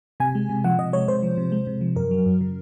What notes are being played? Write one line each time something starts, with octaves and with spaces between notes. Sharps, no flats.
C3 G#5
G#3
C3
F3 F#5
C3 D#5
G#3 C#5
C3 C5
F3
C3
G#3
C3
F3
F#2 A#4
F#3
F#2
C#3